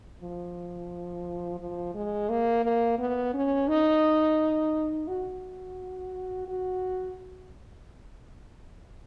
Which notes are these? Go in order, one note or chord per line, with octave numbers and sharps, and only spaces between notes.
F3
F3
G#3
A#3
A#3
B3
C#4
D#4
F#4
F#4